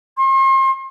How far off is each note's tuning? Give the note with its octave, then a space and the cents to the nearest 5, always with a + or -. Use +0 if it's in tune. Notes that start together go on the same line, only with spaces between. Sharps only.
C6 +40